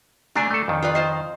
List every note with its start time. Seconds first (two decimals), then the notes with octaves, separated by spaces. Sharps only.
0.35 D3 A3 D4 G#5 A#5
0.51 A3 A4
0.68 F2 D#3
0.82 F4 B4 D5
0.95 F4 C5 D#5